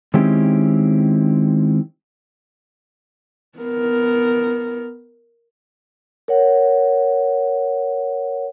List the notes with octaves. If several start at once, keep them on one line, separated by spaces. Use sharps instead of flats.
D#3 G#3 C4 C#4 E4 G4
B3 A#4
A#4 C#5 F#5